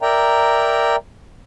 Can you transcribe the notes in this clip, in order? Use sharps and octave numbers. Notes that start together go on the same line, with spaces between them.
A#4 D5 E5 G5 A#5